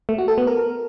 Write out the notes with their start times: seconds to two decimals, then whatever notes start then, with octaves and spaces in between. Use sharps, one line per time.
0.09 A3
0.18 F#4
0.28 A4
0.38 B3
0.47 A#4